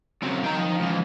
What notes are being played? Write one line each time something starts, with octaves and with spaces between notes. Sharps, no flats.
C#2 C#3 F#3 C4
F#3 D#4 G5 A#5
F3
C#2 E3